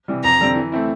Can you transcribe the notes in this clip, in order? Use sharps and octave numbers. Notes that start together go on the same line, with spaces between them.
C3 E3 G3
F2 A#5
D3 G3 C4
E3
A3 C4 E4